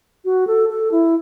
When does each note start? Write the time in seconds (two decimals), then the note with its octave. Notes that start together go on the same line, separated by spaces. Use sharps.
0.25 F#4
0.47 A4
0.69 A4
0.92 E4